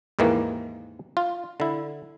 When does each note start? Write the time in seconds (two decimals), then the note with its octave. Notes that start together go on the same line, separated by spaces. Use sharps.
0.19 D#2 G#2 D#3 E3 A#3
1.17 F4
1.60 D3 E4